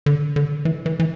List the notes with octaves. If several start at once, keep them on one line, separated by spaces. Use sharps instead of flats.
D3
D3
E3
E3
E3